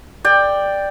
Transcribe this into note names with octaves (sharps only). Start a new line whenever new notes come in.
D5 G5